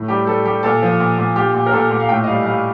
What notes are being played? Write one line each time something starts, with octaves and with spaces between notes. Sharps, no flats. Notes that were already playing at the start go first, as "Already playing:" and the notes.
Already playing: A2
G3 G4
G3 A4
G3 G4
A#2 A4
F3
A#2
A#2
A#2 G4
A#2
A#4
A#2 A4
A#2
F5
A2 G5
D#5
G3 F5
G3 F5